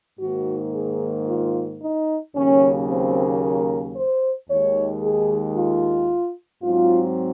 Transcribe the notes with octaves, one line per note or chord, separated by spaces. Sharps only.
G#2 D#3 A#3 F#4
G#4
F4
D#4
D#2 C#3 F#3 A#3 C#4
C4
A#4
C5
D#2 D#3 G#3 C#5
G#4
F4
G#2 F#3 C4 F4